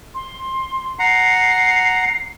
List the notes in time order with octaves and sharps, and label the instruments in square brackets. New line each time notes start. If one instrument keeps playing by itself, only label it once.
[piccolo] C6
[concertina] F#5 A#5 [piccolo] C7